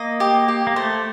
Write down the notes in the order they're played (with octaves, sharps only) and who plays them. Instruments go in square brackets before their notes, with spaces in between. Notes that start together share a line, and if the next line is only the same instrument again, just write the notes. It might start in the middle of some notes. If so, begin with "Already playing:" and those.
Already playing: [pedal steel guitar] A#3 [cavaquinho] D#5
[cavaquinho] G4
G4
[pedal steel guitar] A#3
[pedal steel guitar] A3 [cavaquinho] C5